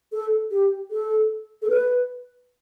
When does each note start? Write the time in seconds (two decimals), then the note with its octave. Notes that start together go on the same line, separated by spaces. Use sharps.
0.12 A4
0.51 G4
0.91 A4
1.62 A4
1.69 B4